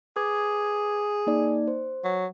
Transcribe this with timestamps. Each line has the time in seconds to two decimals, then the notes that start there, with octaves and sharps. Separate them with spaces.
0.16 G#4 B4 D6 G#6
1.27 A#3 D#4 D5
1.67 C5
2.04 F#3